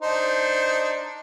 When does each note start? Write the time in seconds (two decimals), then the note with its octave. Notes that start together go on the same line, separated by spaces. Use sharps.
0.02 D4 D#4 C5